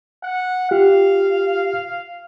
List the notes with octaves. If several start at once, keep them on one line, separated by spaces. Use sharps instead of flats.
F#5
F4 G4 F5